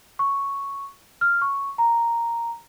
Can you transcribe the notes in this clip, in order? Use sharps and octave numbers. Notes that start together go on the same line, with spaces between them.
C#6
F6
C#6
A#5